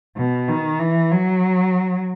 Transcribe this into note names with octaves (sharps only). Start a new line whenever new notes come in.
B2
D#3
E3
F#3